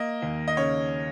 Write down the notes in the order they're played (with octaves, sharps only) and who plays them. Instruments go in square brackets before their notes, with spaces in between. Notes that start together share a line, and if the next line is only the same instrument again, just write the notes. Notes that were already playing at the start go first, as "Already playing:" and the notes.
Already playing: [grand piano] A#3 D#5
D#2
D#5
C#3 C#5